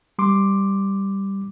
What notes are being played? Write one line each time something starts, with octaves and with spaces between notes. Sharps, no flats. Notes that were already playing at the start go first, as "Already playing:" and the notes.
G3 C6 D6